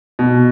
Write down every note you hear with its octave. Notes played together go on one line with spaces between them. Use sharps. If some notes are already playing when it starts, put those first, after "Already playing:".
B2